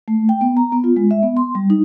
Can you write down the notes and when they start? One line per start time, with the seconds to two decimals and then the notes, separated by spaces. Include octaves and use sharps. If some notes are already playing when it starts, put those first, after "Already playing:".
0.08 A3
0.29 G5
0.41 B3
0.57 A#5
0.72 B3
0.84 F4
0.96 G#3
1.11 E5
1.23 B3
1.37 C6
1.55 G3
1.70 D#4